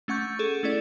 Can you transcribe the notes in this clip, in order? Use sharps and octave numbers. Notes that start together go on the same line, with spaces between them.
A3 C#4 F#5 C#6 G6
G#4 A4
A3 C#4 E4 D5